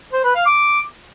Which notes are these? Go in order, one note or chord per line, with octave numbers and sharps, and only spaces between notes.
C5
B4
F5
D6